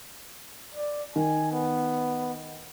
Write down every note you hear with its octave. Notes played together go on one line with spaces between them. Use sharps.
D5
D#3 G#5
B3